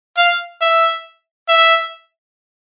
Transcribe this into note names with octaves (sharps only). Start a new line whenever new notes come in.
F5
E5
E5